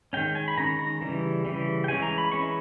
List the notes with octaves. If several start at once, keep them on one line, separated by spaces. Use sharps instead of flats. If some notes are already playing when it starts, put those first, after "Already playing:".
D#3 G#3 C#4 G5
G#5
B5
D#3 G#3 C#4 A#5
A#5
C#3 E3 G3
C#3 E3 G3
G5
E3 G#3 C#4 G#5
A#5
B5
E3 G#3 C#4 C#6